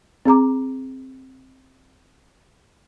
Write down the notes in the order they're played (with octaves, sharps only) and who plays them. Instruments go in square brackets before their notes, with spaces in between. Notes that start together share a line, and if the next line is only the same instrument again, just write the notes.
[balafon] C4 G#4 A#5 D6